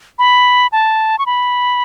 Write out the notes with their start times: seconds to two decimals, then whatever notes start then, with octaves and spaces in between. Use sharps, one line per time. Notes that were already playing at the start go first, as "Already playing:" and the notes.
0.19 B5
0.72 A5
1.19 C#6
1.26 B5